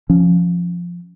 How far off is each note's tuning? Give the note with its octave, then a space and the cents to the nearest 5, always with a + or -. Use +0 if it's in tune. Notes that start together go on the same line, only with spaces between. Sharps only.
F3 +0 C#4 +0